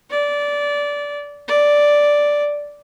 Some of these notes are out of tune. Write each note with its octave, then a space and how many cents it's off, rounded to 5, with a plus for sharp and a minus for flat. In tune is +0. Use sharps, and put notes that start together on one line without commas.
D5 -15
D5 +0